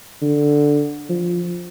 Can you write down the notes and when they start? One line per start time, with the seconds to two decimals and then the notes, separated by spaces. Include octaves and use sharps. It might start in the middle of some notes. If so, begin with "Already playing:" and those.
0.22 D3
1.09 F3